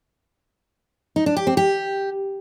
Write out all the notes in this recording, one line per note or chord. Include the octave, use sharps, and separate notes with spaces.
D#4
D4
G4
C4
G4